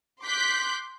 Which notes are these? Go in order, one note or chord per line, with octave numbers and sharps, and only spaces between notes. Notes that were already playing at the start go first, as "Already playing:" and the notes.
C6 D6 F#6 G6 B6